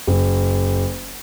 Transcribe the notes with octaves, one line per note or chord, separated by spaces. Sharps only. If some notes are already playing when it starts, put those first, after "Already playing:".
F#1